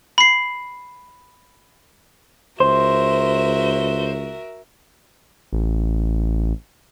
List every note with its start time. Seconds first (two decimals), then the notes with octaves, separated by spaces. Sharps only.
0.18 B5 C7
2.60 C#2 F#4 A#4 C5 E5
5.53 A1